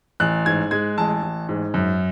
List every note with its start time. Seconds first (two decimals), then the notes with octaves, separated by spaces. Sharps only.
0.20 A1 F#6
0.46 G#2 G#6
0.71 G#3 G#6
0.98 A1 A5
1.23 A1
1.49 G#2
1.74 F#2